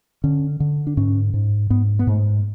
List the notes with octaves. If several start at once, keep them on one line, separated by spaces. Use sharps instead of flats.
D3 C#4
D3
D4
G#2 C#4
G#2
G#2 B3
B3
G#2 A3